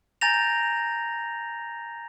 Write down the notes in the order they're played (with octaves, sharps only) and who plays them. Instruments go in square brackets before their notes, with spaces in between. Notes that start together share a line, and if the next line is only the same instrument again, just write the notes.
[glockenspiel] G#5 A#5 G6 A6 A#6 F7